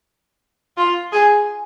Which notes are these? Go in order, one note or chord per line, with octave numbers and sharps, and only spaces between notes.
F4
G#4